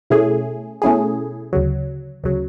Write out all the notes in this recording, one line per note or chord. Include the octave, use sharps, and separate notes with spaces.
B2 A3 C#4 E4 G#4
B2 A3 C#4 E4 G#4
D2 C#3 F#3
D2 C#3 F#3